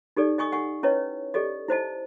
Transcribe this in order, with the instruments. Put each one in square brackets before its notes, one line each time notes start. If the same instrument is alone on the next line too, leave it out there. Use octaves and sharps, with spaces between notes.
[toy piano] D#4 G4 A4 D5
D#5 G#5 C#6 D#6
F#5 G#5 C#6
C#4 E4 B4 C#5 D#5
G4 A4 D5 D#5
E4 C5 D#5 A5